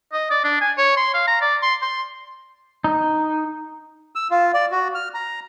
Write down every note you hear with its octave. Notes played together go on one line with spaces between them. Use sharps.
D#5
D5
D4
G#5
C#5
C6
F5
A#5
D5
C6
C6
D#4
E6
F4
D5
F#4
F6
A#5